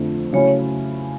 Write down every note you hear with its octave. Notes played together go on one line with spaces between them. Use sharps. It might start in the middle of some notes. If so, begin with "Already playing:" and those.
Already playing: F2 D3 F3 A3 C4
C#3 F#3 A3 C#4 E4 C#5